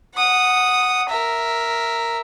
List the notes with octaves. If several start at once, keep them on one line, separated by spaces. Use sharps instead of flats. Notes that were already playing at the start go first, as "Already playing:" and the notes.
F#5 D#6
A#4 E5